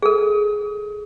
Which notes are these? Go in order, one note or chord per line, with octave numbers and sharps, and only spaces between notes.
G#4 A4